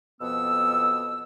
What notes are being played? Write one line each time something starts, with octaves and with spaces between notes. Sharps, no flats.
F2 B2 B3 E6